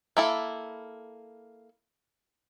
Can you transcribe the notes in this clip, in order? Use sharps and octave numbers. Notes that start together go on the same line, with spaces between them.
A#3 E4 A4